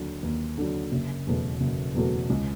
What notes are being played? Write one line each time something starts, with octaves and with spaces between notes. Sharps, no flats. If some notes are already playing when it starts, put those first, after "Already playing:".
Already playing: D#2 D3 F#3
D#2
D3 F#3
F#1
E2 B2 F#3 A3
F#1
E2 B2 F#3 A3
C#2